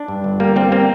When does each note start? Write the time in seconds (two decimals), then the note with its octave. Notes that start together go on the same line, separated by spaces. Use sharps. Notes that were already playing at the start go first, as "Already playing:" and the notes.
Already playing: D4
0.08 G2
0.24 G1
0.40 G3 A#3
0.56 G3 C4
0.72 A#3 C4